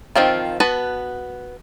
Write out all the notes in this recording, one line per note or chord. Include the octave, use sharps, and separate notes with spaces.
D#3 F3 C4 F4
B3 F#4 B4 A5